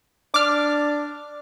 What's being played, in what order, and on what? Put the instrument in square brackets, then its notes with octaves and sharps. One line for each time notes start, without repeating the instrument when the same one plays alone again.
[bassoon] D4 [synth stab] D6 F6